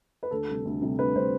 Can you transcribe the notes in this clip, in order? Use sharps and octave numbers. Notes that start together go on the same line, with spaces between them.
B4
D2 A4
C3 G3
D2
C3 G3
D2 B4
C3 G3 C5